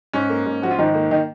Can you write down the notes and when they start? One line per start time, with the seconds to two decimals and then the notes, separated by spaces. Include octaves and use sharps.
0.13 G#2 C#4
0.29 A#3
0.46 G#2
0.62 F3 F#4
0.71 F4
0.78 G#2 D#3 D#4
0.95 A#3
1.11 D#3 D#4